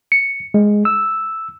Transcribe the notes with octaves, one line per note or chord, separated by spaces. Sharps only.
C#7
G#3
E6